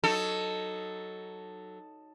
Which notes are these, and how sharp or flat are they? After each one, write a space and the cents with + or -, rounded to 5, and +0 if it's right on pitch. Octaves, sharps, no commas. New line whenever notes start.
F#3 +10 D#4 +0 A4 +5